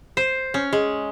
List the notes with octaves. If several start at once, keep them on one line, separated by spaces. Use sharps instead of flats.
C5
C#4
G#3